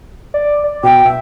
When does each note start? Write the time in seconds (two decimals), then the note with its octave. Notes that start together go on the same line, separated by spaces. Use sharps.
0.34 D5
0.64 D5
0.83 B2 G5
1.05 E5